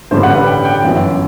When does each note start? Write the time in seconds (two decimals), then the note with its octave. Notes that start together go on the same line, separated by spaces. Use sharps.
0.11 A1 G2 D3 G3 D4 C5
0.23 F#5
0.35 B4
0.46 G5
0.65 G5
0.83 G1 F#2 E3